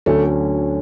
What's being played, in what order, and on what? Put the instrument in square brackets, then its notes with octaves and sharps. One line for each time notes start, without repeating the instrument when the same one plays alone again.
[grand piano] D2 D3 F#3 C#4 [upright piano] A3